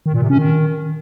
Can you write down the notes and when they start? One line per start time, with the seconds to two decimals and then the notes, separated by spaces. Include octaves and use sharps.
0.06 D#3
0.14 A#2
0.22 C3
0.30 C#4
0.38 D#3